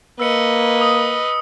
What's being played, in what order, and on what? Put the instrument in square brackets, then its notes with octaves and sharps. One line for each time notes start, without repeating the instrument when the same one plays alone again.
[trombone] A#3 [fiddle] B4 D#5 [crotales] E6 C#7
[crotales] D#6